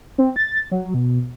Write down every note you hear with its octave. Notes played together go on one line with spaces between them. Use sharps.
C4
A6
F#3
B2